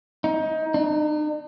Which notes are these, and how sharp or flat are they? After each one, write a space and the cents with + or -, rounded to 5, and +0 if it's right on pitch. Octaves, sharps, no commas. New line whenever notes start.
D#4 +25
D#4 -45